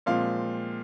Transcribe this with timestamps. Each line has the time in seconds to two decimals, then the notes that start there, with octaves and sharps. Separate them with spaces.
0.06 A#2 F3 G#3 C4 F5